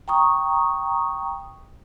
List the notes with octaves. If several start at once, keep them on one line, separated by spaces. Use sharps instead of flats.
G5 A#5 C#6 D#6